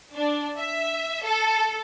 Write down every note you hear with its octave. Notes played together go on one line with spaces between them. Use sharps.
D4
E5
A4